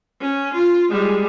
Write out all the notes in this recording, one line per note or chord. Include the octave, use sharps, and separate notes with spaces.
C#4
F4
G3 G#3